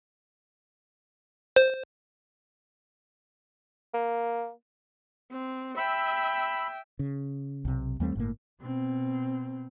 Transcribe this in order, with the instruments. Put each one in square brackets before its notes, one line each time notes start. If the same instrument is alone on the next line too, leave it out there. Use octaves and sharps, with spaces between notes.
[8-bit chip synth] C5
[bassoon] A#3
[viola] C4
[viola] E5 G5 [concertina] B5 E6
[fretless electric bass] C#3
B1 C3
D#2 G3 A3 C4
G1 A2 A#3
[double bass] B2 C4